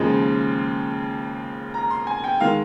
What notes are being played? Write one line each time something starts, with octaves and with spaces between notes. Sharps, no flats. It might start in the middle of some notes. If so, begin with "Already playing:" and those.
Already playing: D#2 C#3 F3 G#3
A#5
C6
G#5
G5
D#3 G#3 F5